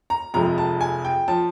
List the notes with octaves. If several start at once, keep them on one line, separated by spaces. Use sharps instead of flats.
A#5
F1 F2 C3 F3 G#3 A#5
A5
G#5
G5
F3 A5